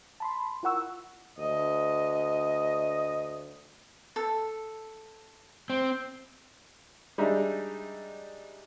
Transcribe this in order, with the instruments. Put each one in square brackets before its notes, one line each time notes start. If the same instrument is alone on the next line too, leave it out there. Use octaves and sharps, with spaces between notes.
[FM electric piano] A5 B5 C6
E4 F4 A#4 F#5 C#6 E6
[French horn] D2 [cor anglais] D#5
[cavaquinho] A4
[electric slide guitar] C4
[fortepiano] G3 G#3 D4 D#4 E5